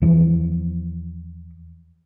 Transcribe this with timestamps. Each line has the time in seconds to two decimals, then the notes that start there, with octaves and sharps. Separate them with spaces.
0.02 E2 E3 F3